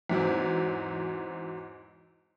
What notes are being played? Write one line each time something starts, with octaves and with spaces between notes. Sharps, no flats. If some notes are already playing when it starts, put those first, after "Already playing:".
E2 G#2 F#3 C4